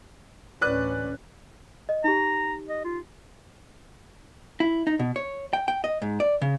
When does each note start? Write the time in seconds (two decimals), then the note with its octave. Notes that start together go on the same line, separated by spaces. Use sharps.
0.61 A1 D2 C#4 B4 D5 F#6
1.89 D#5
2.04 D#4 G4 A#5
2.69 D#5
2.84 F4
4.60 E4
4.87 D#4
4.99 B2
5.16 C#5
5.53 G5
5.68 G5
5.84 D#5
6.02 G#2
6.20 D5
6.42 C#3